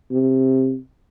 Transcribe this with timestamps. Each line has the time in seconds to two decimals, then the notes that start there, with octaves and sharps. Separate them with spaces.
0.11 C3